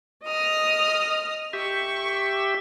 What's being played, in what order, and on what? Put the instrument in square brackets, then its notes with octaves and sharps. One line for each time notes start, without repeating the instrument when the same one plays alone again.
[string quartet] D#5 D#6 F6
[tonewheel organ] G4 E5 [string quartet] C#6